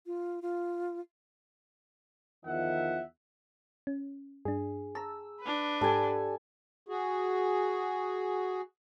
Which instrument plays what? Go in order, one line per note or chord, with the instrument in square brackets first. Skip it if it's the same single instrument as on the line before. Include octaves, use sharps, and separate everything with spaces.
[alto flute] F4
F4
[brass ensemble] E2 D#3 F3 E5 F#5
[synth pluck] C#4
[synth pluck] G2 D4 [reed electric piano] G#4
[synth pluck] A5 A#5 [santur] E6
[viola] D4 B4
[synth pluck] G#2 [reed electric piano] G4 D5 [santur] A4 G#5
[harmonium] F#4 G#4